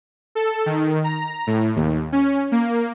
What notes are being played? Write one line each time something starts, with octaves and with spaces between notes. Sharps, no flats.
A4
D#3
A#5
A2
D#2
C#4
A#3